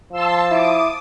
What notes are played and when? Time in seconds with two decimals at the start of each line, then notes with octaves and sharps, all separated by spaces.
0.12 F3 A5 C6 E6
0.51 E4 D6 D#6